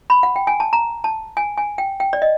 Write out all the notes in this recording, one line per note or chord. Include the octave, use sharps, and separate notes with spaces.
B5
F#5
G5
G#5
A5
A#5
A5
G#5
G#5
G5
G5
D5
D#5